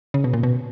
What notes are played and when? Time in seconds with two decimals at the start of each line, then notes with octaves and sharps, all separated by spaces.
0.14 C#3
0.24 B2
0.33 A#2
0.43 B2